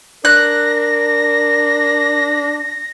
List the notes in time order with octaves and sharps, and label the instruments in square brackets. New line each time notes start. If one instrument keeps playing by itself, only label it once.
[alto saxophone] D4 [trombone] A#4 [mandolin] F#6 [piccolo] A#6